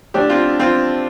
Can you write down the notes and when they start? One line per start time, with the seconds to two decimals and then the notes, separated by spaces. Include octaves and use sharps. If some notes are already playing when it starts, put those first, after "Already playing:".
0.14 D3 A3 D4 G4
0.30 C4 F4
0.60 C4 F4